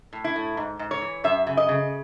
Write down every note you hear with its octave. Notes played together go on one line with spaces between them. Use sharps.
A2
E4
A2
G#2
G#2
C#5
E3
F#2 E5
C#3
D#5
C#3